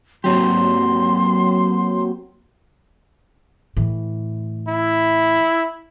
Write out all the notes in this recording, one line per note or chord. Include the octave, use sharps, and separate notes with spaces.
F#3 A#3 C4 G4 C6
A2 E3
E4